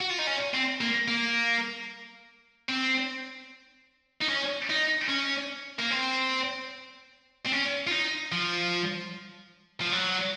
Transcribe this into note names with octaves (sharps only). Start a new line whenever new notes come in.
F#4
F4
D#4
C#4
C4
A#3
A#3
C4
D#4
C#4
D#4
C#4
A#3
C4
C4
C#4
F4
D#4
F3
F3
F#3